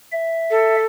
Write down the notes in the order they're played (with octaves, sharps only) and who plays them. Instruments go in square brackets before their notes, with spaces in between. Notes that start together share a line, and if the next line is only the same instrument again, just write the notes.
[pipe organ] E5
[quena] A4